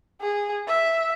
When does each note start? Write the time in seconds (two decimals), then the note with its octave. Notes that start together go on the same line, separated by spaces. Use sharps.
0.21 G#4
0.68 E5